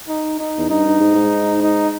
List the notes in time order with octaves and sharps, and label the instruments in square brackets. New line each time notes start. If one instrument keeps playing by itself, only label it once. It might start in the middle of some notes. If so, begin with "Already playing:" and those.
[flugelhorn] D#4
D#4
[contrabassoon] E2
[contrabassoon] G2 [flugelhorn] D#4
[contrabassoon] G2
G#2
G#2
[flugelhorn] D#4